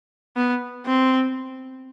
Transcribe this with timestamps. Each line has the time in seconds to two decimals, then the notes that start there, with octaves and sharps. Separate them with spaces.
0.36 B3
0.86 C4